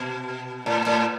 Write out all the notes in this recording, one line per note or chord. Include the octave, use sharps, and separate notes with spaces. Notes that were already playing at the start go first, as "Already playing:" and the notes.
Already playing: B2
A2
A2